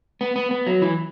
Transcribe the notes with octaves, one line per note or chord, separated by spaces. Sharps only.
B3
B3
B3
F#3
E3